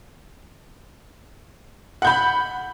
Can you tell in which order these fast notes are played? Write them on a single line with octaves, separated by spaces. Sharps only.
F#5 G6 B5